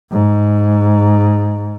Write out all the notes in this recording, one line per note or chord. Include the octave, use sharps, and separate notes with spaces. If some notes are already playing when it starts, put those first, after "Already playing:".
G#2